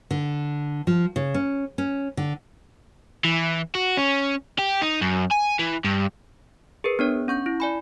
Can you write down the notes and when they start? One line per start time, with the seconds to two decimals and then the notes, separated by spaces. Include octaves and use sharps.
0.11 D3
0.87 F3
1.16 C#3
1.34 C#4
1.78 C#4
2.17 D3
3.25 E3
3.75 F#4
3.97 C#4
4.59 G4
4.82 D#4
5.01 F#2
5.31 G#5
5.59 E3
5.84 G2
6.84 G#4 A#4 B4
6.99 B3 D4 C#5
7.28 C#4 C#6 G6
7.46 E4
7.60 D5 G#5 B5